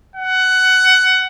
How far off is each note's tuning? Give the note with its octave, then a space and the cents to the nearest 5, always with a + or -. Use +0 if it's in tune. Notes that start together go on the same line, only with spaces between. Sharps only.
F#5 +15